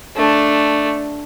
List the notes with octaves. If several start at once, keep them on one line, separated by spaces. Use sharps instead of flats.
A3 D4